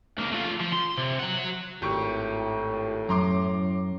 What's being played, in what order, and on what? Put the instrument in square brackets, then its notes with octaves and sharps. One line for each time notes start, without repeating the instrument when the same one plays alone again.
[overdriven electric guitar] C#2 A#3
A3 F4
F3
C6
C3
F#3 F#5
[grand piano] G#1 G4 C#6 [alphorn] A2
[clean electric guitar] F#2 [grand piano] A#5 C6 D6